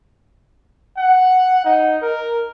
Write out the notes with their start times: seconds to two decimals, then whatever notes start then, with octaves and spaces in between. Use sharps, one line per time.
0.98 F#5
1.65 D#4
2.02 A#4